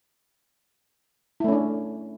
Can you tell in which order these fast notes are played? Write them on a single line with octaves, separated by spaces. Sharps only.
E4 A3 C#4 D4